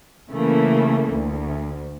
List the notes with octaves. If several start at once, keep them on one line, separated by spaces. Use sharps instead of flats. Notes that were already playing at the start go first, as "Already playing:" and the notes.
C#3 E3 A3 A#3
D2